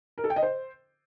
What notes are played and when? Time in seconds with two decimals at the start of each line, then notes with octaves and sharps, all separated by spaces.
0.18 A#4
0.24 A4
0.30 G5
0.36 D#5
0.43 C5